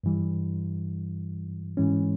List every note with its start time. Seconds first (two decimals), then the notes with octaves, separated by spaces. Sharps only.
0.04 G2 E3 G3
1.77 G#2 E3 G#3 C#4